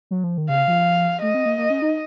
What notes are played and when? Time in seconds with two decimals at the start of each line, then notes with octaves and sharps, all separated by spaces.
0.11 F#3
0.24 F3
0.38 D#3
0.49 C#3 F5
0.68 F3
1.22 A3 D#5
1.34 C4
1.46 A#3
1.58 A#3
1.70 C#4
1.82 D#4